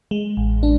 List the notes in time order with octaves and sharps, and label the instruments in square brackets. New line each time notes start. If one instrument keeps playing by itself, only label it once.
[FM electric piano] G#3
A1
D4